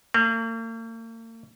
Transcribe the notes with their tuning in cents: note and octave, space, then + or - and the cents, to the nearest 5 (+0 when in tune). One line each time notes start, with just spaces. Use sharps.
A#3 -45